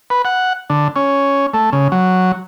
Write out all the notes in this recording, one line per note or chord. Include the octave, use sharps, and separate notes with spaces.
B4
F#5
D3
C#4
A3
C#3
F#3